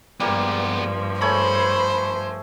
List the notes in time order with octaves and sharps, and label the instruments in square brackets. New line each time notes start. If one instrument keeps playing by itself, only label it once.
[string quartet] G2 F3 [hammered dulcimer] G3 A#3 [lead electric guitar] G#3 B3
[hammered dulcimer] A3 G#4 C#5 [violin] C5 [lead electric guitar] B5